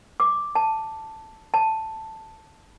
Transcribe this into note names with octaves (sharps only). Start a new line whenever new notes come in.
D6
A5
A5